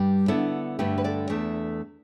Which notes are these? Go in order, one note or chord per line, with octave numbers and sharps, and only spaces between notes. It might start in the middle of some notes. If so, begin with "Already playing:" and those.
Already playing: G2 G3
D3 B3 D4 E4 A4
G2 D3 A3 D4 G4 B4
B4
A4 D5
E2 E3 A3 D4